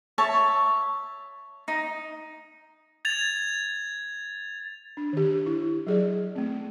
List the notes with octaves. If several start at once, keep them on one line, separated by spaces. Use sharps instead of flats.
C#5 E5 A5
D#4
G#6 A6 F7
D4
D#3 G4
E4
F#3 G#4 D5
A3 C4